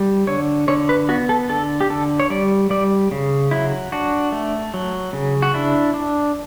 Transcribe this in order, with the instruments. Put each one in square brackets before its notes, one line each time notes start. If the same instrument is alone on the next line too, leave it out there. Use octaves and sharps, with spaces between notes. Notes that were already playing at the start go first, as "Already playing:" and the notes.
Already playing: [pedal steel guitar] G3
D3 C#5
D3 C#5
B4
B3 F#4
A4
D3 A4
G4
D3 A4
C#5
G3 D5
G3 D5
C#3
F#3 E4
D4 F#4
A3
F#3
C#3
F#4
D4 E4
D4